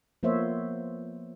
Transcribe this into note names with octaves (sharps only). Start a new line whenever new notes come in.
F3 A#3 B3 C5 C#5 E5